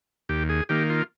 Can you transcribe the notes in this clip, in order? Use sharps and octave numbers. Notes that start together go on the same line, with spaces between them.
D#2 G4
G#4
D#3 A#3 G4
F4